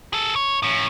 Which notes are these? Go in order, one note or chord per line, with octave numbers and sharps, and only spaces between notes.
G#4 A4
C#5
A2 C#4